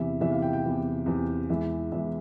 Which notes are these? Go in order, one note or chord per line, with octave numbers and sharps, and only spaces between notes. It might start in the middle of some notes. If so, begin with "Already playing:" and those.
Already playing: E2 C3 E3 E5
E2 C3 E3 E5
F5
G5
G5
E2 C3 E3
E2 C3 E3
E2 E3 G#3 E5
E2 E3 G#3 E5